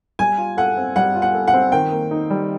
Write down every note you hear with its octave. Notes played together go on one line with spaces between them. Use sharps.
G3 G#5
F4
A4 F#5
C4
G3 F#5
F4
F#5
A4
F#5
C4
D#3 G5
A#3
D#4
G3